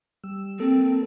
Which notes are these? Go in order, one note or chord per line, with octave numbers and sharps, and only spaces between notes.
G3 E6
A#3 C4 A4